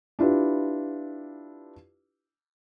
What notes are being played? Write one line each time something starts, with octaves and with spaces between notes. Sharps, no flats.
D4 E4 F4 G4 B4